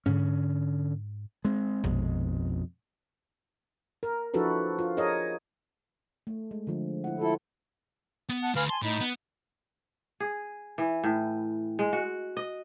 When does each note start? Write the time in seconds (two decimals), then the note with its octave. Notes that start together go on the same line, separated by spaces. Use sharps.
0.06 G#2 D3 C#4
1.45 G#3 C4
1.84 A#1 F2 B2 G#3
4.03 A#4
4.34 F3 D4 E4 F#4 A4 B4
4.79 F4
4.97 G#4 A#4 C#5 D#5
6.27 A3
6.51 G#3
6.67 D3 F3
7.04 E4 F#5
7.19 E4 F4 A4 C5
8.29 B3
8.41 F#5 A5
8.55 D2 B4 F5 G#5 B5
8.69 G#5 A5 C6
8.82 A2 D#4 B5
9.01 B3
10.20 G#4
10.78 E3
11.04 A2
11.79 G#3
11.93 F#4
12.37 D#5